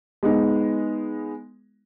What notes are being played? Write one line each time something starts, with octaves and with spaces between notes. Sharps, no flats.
G#3 B3 D#4